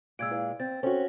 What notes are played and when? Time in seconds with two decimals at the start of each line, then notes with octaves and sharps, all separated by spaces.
0.19 A#2 G#3 E6 G#6 D7
0.31 E4 B4 F5
0.60 C4 A6
0.83 C4 C#4 F#4 A4